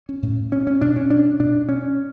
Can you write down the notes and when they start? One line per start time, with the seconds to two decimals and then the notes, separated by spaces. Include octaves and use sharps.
0.09 C#4
0.23 A2
0.52 C#4
0.67 C#4
0.81 B2 D4
0.96 C#4
1.10 D4
1.40 B2 D4
1.69 C#4